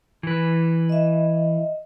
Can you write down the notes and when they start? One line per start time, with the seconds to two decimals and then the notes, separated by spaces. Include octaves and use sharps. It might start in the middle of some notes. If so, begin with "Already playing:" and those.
0.23 E3 B4
0.89 D#5 E5